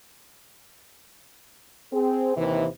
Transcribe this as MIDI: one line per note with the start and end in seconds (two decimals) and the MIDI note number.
1.93 2.36 60
1.93 2.36 68
2.37 2.66 39
2.37 2.66 48
2.37 2.66 52